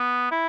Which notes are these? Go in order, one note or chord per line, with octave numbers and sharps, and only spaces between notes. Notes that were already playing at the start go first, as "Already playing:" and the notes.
Already playing: B3
E4